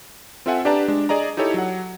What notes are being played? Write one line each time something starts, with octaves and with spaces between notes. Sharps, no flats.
C4 F4 A4 E5 F#5 G#5
D4 G4 B4 D5 A5 A#5
G#3 D4
G#4 D5 D#5 A#5
D#4 E4 G4 A4 C#5
F#3 F#5